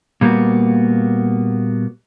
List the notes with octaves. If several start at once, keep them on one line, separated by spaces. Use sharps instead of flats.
A#2 G3 A#3 B3 F#4